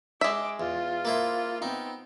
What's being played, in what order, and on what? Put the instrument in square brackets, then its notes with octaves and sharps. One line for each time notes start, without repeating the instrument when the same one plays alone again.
[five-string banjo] G#3 E5 [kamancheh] D6
[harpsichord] E2 [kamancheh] F4
[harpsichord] A#3 E4 C5
[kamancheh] B3 C4 [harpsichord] D#4